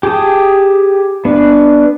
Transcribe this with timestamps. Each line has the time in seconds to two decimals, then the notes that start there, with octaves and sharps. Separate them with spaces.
0.03 G4 G#4 G5 A5 D#6
1.25 B3 D4 B4